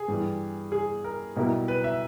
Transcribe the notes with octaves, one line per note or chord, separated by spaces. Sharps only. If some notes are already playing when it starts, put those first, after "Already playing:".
Already playing: G#4
G2 E3 G3
G#4
A#4
B1 B2 G3 A#3 E4
B4
E5